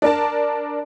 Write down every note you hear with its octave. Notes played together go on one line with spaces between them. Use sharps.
D4 A#4 A5